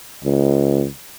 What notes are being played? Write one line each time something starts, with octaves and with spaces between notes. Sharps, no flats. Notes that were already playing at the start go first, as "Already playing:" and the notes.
C#2